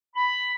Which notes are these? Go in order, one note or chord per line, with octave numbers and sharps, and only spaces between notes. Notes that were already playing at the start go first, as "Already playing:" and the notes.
B5